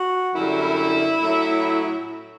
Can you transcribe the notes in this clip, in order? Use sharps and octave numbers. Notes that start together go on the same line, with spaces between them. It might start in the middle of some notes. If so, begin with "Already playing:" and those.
Already playing: F#4
F#2 D3 G3 E4
A2 F#3 A3 C#4